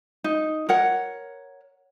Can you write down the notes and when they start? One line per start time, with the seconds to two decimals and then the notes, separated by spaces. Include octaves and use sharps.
0.24 D#4
0.69 A#4 C#5 F#5